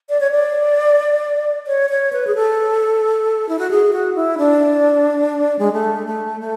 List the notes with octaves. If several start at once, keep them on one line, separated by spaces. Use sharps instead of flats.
D5
C#5
D5
C#5
C#5
B4
G#4
A4
E4
F#4
G#4
F#4
E4
D4
G#3
A3
A3
A3